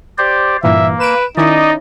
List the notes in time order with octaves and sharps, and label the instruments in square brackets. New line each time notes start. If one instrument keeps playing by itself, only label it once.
[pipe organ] G4 C5 D5
[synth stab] G2 A#2 E3 [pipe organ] A#3 [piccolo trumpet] E5
[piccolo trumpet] B4 [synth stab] D7 E7
[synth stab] D#3 C#4 E4 [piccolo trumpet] D#4 [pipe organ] D5 D#5